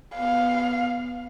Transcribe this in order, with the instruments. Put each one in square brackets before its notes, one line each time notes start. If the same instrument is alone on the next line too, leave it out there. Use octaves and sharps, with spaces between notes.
[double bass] B3 [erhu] F5